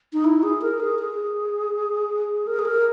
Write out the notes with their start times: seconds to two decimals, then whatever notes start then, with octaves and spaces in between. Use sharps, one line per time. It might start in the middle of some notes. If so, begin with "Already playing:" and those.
0.13 D#4
0.24 E4
0.43 G#4
0.62 A#4
0.80 G#4
0.99 G#4
2.47 A#4
2.59 G#4
2.65 A#4